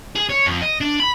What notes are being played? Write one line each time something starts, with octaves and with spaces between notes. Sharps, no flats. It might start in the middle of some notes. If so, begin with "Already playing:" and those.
G#4
C#5
F2
D#5
D4
B5